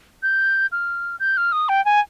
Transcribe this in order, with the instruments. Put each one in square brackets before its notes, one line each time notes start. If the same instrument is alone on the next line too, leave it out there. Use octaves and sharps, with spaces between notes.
[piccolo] G6
F6
G6
F6
D#6
G5
G#5